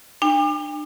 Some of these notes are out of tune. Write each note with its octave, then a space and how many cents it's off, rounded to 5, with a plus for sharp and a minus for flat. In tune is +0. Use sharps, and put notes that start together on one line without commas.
D4 +35 G5 +45